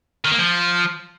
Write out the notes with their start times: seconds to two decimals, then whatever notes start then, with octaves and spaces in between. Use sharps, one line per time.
0.25 D#3
0.32 A#3
0.39 F3